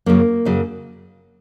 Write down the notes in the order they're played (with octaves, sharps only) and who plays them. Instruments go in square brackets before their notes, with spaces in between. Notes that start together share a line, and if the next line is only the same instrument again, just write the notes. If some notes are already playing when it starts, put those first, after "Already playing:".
[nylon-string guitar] F#2 C#3 F#3 A#3
F#2 C#3 F#3